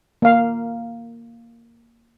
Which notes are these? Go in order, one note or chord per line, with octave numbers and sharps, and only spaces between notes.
A#3 F5